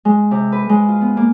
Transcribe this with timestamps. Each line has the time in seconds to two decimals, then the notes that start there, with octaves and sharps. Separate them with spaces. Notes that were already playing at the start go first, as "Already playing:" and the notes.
0.05 G#3
0.31 C3
0.52 B4
0.69 G#3
0.88 F4
1.01 B3
1.17 A#3